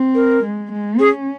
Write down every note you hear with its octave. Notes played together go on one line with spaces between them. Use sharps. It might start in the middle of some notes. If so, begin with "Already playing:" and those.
Already playing: C4
A#4
G#3
G#3
C#4 G#4